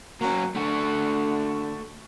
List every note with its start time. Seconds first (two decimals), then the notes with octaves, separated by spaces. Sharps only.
0.21 F#3 A#3 C#4
0.55 D3 A3 F#4